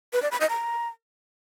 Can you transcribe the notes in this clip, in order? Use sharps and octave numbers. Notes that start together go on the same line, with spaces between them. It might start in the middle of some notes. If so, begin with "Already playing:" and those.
B4
D5
B5
D#5
A#5